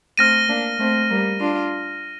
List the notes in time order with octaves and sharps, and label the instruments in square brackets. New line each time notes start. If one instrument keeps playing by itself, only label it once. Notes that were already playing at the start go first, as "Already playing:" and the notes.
[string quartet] A3 C4 [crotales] F6 A#6 D#7
[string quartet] A#3 D4
A3 C4
G3 A#3
D4 F4